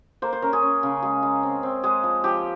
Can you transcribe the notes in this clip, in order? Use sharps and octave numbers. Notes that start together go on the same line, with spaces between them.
A#3 C5
C5
C#4 A#4
G#4
C#4
C#3
G#3 G#4
G#3
C4
C4
G#3 G#4
F3
F3 G4